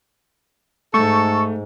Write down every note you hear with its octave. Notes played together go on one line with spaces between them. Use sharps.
G#2 A3 A4 C#6